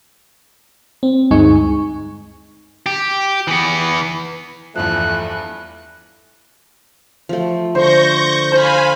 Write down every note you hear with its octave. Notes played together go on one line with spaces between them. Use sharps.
C4
D2 G2 G#3 D#4 G#5 C#6
G4
E3 B3
E2 G2 F3 A3 F#6
F3 A3
D3 C5 C#6 G6 A#6
C5 F5 G#5 B5